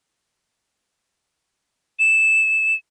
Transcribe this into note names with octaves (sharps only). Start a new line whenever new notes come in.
E7